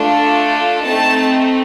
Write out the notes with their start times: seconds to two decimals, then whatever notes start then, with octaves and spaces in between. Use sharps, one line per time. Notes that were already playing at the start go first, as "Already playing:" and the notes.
Already playing: A3 D4 F4 A4
0.83 A3 C4 D#4 A5